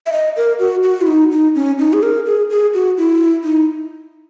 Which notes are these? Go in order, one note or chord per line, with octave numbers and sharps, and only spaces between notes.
E5
D#5
A#4
F#4
F#4
E4
D#4
D#4
C#4
D#4
G#4
A#4
G#4
G#4
F#4
E4
D#4